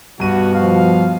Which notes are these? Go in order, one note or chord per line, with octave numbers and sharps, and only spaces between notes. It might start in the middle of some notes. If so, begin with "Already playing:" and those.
G2 B2 F#4 D#7
F3 F5